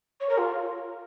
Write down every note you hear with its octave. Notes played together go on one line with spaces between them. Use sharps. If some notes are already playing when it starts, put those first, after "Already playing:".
C#5
A#4
F4